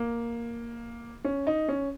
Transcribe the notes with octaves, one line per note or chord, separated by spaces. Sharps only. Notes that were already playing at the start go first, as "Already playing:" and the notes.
Already playing: A#3
C#4
D#4
C#4